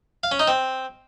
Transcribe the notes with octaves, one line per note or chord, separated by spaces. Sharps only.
F5
C#4
D#4
C4